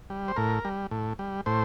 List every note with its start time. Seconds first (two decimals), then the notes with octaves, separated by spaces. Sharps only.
0.10 G3
0.28 C5
0.36 A2 A#4
0.65 G3
0.91 A2
1.19 G3
1.46 A2 C5